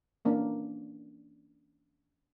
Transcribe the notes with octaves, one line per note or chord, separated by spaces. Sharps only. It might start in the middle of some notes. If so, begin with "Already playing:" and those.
E3 A#3 C#4 D4